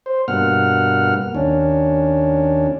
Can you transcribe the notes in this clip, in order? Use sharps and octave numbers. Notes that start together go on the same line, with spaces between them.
C5
G2 B2 A#3 F#5 F6
D#2 C#4 D4